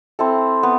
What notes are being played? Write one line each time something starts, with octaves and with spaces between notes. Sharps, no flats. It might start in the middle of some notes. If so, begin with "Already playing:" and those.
C4 E4 A4
B3